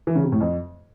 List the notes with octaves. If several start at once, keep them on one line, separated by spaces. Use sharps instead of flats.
E3
C#3
C3
A2
F2